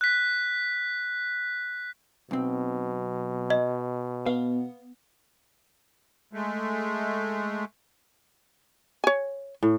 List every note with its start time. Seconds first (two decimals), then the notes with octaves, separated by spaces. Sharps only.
0.01 F#6 B6
2.31 B1 B2 C4
3.50 D#5
4.26 B3 F5
6.33 G#3 A3
9.04 C#5 G#5
9.63 A2